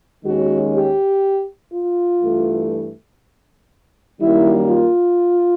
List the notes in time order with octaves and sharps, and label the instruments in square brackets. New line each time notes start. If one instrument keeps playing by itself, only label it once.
[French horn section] D#2 D#3 G#3 C#4 F#4
G4
F4
G2 E3 A3
F#2 D#3 G3 A#3 E4
F4